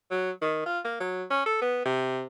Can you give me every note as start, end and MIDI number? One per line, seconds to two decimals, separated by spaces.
0.11 0.31 54
0.42 0.64 51
0.66 0.79 65
0.85 0.96 58
1.00 1.24 54
1.30 1.43 61
1.46 1.60 69
1.62 1.80 59
1.85 2.24 48